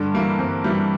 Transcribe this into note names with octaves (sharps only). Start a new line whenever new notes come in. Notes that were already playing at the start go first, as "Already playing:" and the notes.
Already playing: G2 D3 D4
E3 G3 A#3
G2 C4
E3 G3